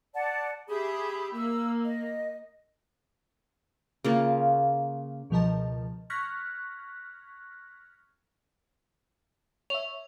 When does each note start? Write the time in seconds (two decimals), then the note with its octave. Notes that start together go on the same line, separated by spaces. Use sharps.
0.14 D5 F#5 A5
0.68 G4 G#4 E5 B5 D#6
1.36 A#3 E6
1.85 D#5
4.04 C#3 A#3 F4
5.30 C#2 B2 F3 A#4 D#5 A5
6.10 C#6 F6 F#6 G#6 A#6 B6
9.70 C#5 E5 F7